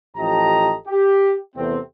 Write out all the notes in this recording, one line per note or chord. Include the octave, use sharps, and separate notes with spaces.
A1 F3 G4 A4 D#5 A#5
G4
E2 C3 A3 B3 C4